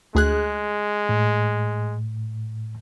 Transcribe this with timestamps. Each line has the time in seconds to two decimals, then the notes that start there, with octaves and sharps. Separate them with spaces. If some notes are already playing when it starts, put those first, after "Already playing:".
0.15 D2 G#3 G#4 F#6
1.09 A2